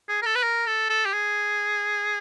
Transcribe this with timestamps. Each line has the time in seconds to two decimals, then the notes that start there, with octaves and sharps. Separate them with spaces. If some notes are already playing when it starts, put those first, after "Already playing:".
0.09 G#4
0.22 A#4
0.26 A4
0.36 B4
0.43 A#4
0.67 A4
0.90 A4
1.06 G4
1.13 G#4